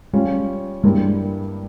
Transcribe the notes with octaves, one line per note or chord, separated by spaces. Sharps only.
G3 G#3 C#4 F4
G2 G3 G#3 A#3 E4 A#4